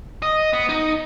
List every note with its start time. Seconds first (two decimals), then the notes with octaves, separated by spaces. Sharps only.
0.22 D#5
0.53 B3
0.69 D#4